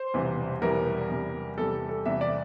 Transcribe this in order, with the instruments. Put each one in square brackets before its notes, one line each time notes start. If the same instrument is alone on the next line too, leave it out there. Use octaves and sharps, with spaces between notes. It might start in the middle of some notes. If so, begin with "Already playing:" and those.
Already playing: [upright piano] C5
[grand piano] E1 E2 C3 E3 G3
[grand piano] E1 E2 C3 E3 G3 [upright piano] A#4
[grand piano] E2 C3 G3
[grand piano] E2 C3 G3 [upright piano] A4
[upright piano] A4
[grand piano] E2 C3 G3 [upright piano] E5
[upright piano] D5